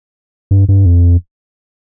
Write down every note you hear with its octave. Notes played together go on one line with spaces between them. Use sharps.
G2
G2
F2